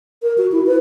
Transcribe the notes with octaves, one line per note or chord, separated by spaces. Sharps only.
A#4
F#4
E4
B4